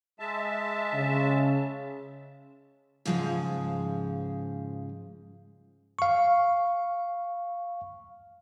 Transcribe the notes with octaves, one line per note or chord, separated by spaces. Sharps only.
G#3 E5 A5
C#3
G#2 C#3 F3 G3 G#3
F5 C#6